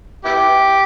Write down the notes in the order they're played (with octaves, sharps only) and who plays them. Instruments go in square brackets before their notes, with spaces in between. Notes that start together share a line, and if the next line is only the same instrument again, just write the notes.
[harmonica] B3 E4 G4